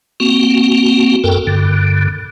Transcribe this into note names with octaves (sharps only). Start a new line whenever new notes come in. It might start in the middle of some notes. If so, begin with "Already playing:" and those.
A#3 C4 F#4
F#2 A4 A#4 G5
G2 D3